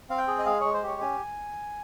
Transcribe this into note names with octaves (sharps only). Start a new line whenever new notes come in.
C4 F5
G5
G#4
D#5
G#3 F5
G#3 C#5
C5
G4 C#5
C#4 G#5